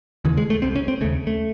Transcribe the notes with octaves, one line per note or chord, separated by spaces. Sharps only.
D#2 C#3 E3
G#3
A3
C2 C3 C4
C#4
C4
D#2 C#3 A3
A3